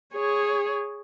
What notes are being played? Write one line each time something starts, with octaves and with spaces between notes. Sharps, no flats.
G#4 C#5